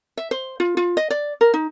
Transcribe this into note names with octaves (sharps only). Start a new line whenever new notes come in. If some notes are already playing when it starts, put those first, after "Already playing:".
E5
C5
F4
F4
D#5
D5
A#4
D#4